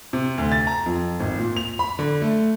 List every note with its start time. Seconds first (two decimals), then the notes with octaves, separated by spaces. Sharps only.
0.13 C3
0.38 D2
0.52 A6
0.67 A#5
0.86 F2
1.20 G#1
1.39 A#2
1.57 F7
1.79 B5
1.99 D3
2.22 A3